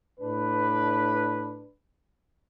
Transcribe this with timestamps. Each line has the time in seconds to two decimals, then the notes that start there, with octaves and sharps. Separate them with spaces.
0.20 A2 D4 B4